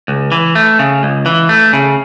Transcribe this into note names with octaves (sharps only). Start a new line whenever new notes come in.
C#2
E3
A3
C#3
C#2
E3
A3
C#3